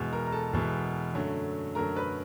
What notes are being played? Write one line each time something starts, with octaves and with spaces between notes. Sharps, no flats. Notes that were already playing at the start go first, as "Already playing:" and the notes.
Already playing: E2 B2 G#3
A#4 A#5
A#5
A4 A5
E2 B2 G#3
F#2 D3 F#3 A3
F#2 D3 F#3 A3 A#4 A#5
B4 B5